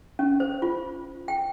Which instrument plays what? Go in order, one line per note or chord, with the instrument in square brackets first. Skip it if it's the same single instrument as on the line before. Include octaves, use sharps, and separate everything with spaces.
[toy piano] C#4
C5
F4
G5